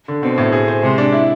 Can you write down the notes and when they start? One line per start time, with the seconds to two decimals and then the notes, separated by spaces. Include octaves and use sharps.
0.08 D3
0.22 B2 C4
0.38 A2
0.52 G#4
0.68 C5
0.82 C3 G#3
0.98 D4
1.12 E4